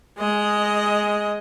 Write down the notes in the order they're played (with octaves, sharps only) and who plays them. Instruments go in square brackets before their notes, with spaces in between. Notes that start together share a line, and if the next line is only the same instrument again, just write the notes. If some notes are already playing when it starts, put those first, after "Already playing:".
[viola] G#3 D#5